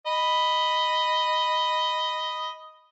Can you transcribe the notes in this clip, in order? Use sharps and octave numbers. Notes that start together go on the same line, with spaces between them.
D#5 B5